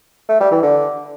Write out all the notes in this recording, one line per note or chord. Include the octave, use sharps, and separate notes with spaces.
A3
G3
E3
D3